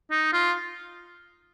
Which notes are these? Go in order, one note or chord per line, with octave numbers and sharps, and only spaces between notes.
D#4
F4